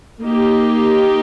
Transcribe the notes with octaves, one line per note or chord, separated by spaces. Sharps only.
A#3 D#4 G4